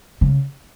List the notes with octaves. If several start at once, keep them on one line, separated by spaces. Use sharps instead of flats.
C#3